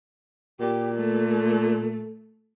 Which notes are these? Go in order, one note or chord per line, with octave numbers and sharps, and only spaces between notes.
A#2 G4
A3